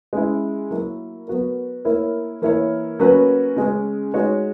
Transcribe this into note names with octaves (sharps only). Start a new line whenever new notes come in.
G#3 C#4 E4
F#3 A#3 E4 A#4
F#3 B3 F#4 A#4
A#3 E4 A#4 C#5
E3 A#3 E4 A#4 C#5
F#3 A#3 C#4 F#4 B4
C#3 G#3 C#4
G#3 D#4 F#4 C#5